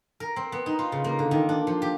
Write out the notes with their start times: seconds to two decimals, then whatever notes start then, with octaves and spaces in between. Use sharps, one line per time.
0.20 A#4
0.36 C4
0.52 B3
0.66 D#4
0.79 F4
0.92 C#3
1.04 A#3
1.19 D3
1.31 D#3
1.49 D4
1.67 F3
1.82 G4